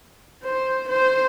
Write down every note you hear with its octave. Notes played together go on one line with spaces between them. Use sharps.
C5
C5